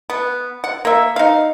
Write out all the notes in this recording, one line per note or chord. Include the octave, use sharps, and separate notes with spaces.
B3
F#5
A#3 E5
D#4 F5